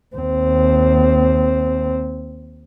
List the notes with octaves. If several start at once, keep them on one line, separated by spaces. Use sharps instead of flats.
D#2 C4